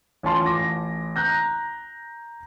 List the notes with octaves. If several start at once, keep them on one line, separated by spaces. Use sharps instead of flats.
A1 C#4 F4 A5 C6
A1 D6 A#6
A#5 F#6 G6 A#6